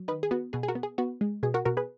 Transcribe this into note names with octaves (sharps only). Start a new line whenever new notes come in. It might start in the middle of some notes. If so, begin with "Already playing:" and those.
Already playing: F#3
D#3 B4 D#5
G#4
B3 F#4
B2 G#4
G#4
F#4 A#4
B3
G#4
B3 F#4
G#3
B2 G#4
F#4 A#4
B2 F#4 A#4
G#4 B4